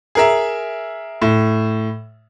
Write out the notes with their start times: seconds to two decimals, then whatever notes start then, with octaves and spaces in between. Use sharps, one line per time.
0.15 G#4 A#4 E5
1.22 A2